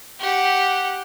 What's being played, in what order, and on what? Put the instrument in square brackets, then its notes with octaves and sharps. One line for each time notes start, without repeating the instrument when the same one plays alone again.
[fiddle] G4 F#5